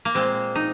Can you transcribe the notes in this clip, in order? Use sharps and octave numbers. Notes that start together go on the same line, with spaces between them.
A#3
A#2 G#3 C4
D#4